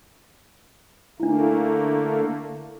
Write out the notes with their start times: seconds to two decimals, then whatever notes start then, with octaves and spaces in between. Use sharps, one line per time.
1.20 D3 A3 A#3 D4 E4